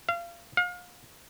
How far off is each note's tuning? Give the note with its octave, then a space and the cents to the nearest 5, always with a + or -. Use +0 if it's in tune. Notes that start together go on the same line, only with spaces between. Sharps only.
F5 -30
F5 +35